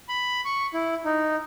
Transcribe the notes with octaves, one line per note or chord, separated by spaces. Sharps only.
B5
C#6
E4
D#4